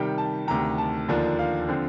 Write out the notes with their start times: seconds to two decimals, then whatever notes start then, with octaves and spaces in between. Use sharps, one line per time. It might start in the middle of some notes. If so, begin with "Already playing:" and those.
Already playing: C3 D#3 G3 G5
0.18 A5
0.47 D2 C3 D#3 A#5
0.78 A5
1.08 D#2 D3 F3 A#3 D4
1.39 F5
1.69 D3 F3 C4